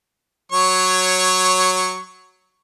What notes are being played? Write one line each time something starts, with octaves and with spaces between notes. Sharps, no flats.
F#3 C#5 C#6